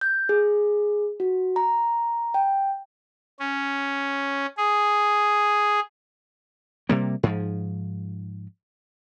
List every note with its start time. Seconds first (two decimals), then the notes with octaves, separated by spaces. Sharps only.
0.01 G6
0.29 G#4
1.20 F#4
1.56 A#5
2.34 G5
3.39 C#4
4.57 G#4
6.89 C3 G3 A#3
7.23 G#2 F3